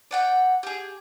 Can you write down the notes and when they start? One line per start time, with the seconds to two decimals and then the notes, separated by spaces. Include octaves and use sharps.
0.11 D5 F#5 G5
0.63 G4 G#4